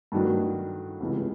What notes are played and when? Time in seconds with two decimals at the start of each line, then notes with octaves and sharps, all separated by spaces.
0.12 G2 D#3 F#3 A3 D4
1.00 C#2 C3 E3 G#3